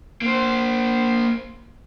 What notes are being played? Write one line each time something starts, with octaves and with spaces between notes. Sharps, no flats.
A#3 C5